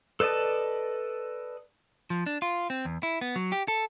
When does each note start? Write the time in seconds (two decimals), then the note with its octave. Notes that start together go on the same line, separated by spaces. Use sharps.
0.20 A4 B4 D5 D#5 A5
2.10 F3
2.26 D4
2.42 F4
2.70 C4
2.85 E2
3.03 E4
3.21 B3
3.36 F#3
3.52 G4
3.68 A4